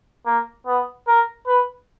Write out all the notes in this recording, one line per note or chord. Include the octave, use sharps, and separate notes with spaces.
A#3
B3
A#4
B4